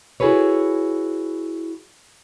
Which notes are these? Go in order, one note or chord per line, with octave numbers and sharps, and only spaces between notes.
E4 F#4 G#4 A4 B4 C#5